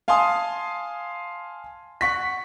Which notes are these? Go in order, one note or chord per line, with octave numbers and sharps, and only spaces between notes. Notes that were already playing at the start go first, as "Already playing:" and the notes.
F5 G#5 A5 C6 D#6
F#5 C#6 B6